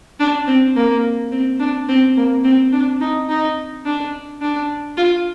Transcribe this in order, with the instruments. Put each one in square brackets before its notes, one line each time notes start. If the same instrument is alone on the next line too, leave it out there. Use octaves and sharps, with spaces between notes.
[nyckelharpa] D4
C4
A#3
C4
D4
C4
A#3
C4
D4
D#4
D#4
D4
D4
F4